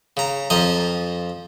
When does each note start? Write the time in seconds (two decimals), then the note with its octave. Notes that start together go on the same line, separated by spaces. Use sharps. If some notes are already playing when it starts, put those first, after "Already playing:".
0.17 C#3 A#5
0.50 F2 F3 D#5 A#5